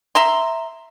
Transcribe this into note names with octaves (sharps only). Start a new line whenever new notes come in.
E5 A#5 C6